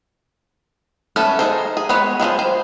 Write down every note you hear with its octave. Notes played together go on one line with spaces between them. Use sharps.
A3 B3 C#4 A4
D#4 G#4 C5
G#4
G#3 B3 B4 C#5
F3 F#3 G#3 G#4
C5